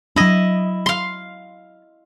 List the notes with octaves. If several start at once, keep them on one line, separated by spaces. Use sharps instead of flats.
F#3 D4 E4 D#5
F5 C6